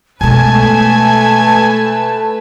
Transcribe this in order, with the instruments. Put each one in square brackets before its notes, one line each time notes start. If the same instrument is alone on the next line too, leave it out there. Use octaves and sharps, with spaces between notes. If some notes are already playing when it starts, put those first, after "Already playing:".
[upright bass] B2 G#3 [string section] A3 B4 [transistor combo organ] G#5 [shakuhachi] A5